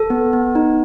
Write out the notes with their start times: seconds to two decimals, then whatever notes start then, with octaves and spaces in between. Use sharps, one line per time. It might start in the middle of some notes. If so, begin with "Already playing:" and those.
Already playing: A4
0.10 B3
0.33 B3
0.55 D#4